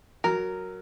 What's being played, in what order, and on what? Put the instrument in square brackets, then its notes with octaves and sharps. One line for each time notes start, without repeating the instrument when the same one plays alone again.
[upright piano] F#3 [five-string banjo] A#4